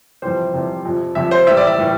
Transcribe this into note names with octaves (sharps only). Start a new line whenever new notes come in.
F2 C3 E3 G3 C5
F2 C3 E3 G3
F2 C3 F3
F2 C3 F3 E5
C5
A2 E3 G3 E5
D5
E5
A2 E3 G3